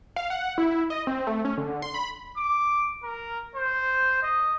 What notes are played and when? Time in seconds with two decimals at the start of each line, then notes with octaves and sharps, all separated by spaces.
0.16 F5
0.30 F#5
0.58 E4
0.90 D#5
1.07 C4
1.27 A3
1.45 C#4
1.57 D3
1.82 C6
1.94 B5
2.37 D6
3.03 A#4
3.55 C5
4.23 D#5